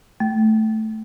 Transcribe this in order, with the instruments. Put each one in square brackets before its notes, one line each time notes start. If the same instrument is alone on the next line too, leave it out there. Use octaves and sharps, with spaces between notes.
[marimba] A3